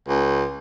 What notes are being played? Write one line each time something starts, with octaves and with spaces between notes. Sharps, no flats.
C#2